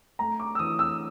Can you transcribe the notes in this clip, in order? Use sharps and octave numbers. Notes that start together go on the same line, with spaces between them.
A3 A#5
D6
E6
E3 D#6
E6